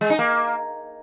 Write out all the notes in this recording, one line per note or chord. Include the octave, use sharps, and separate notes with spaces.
G#3
D#4
A#3